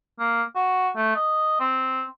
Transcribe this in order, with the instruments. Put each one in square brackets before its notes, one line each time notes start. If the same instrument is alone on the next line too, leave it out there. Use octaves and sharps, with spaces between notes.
[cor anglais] A#3
F#4
A3
D#5
C4